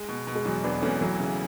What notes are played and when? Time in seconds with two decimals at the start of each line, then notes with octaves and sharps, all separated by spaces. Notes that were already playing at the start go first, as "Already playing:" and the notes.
Already playing: G#3
0.08 B2
0.27 B2
0.35 G#3
0.45 E2 F#3
0.64 E1 B3 D4
0.82 E2 A3 C#4
1.01 E3 F#3 A3
1.20 C#3